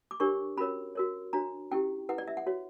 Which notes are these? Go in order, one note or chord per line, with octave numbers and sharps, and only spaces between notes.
D6
D4 G4 A#4 C#5 C#6
C#4 F#4 A#4 C#5 B5
F#4 A#4 C#5
D4 F#4 C#5 A#5
C#4 E4 G4 G5
E4 B4 F#5
D5
E5
F#5
F#4 C#5